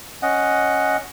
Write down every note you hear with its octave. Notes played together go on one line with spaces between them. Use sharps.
C#4 D#5 F#5